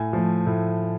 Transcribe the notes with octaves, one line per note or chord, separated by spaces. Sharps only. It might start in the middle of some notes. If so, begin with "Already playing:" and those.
Already playing: A2 G#5
F3 A3
A2